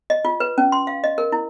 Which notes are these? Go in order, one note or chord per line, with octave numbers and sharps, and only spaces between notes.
D#5
F4
B4
C#4
C6
F5
D#5
A#4
E4